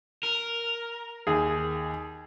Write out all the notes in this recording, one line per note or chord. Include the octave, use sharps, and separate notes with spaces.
A#4
D#2 G#4